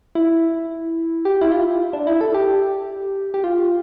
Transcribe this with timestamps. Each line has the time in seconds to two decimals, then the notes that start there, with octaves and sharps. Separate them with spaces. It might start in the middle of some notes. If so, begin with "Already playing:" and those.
0.15 E4
1.25 G4
1.41 E4
1.52 F4
1.93 D4
2.07 E4
2.21 A4
2.34 G4
3.34 G4
3.44 F4